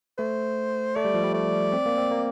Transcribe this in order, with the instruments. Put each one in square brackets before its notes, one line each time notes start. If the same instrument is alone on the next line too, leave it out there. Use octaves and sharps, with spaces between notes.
[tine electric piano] A3 [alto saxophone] C5
[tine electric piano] A3 [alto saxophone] D5
[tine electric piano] G3
F3
G3
[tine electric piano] A3 [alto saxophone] D5
[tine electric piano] C4
A#3
C4
A#3